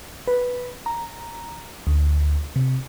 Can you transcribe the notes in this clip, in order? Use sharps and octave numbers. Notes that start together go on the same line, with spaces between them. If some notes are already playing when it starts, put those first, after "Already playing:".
B4
A#5
D2
C3